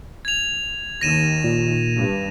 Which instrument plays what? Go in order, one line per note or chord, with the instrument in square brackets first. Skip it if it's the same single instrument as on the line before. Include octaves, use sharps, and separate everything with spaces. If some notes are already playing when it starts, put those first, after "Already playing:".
[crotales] G#6 F7
[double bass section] D#2 D#3 [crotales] A#6 D#7 E7
[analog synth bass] A#2
[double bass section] G2